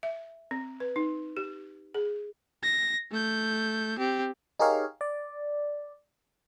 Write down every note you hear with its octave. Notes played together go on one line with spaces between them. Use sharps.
E5
C4
B4
D#4
G4
G#4
A#6
A3 G6
C4 G4
D#4 G4 G#4 A#4 C#5 F5
D5